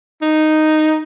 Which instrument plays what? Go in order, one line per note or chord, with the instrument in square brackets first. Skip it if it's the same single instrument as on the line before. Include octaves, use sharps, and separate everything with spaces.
[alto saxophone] D#4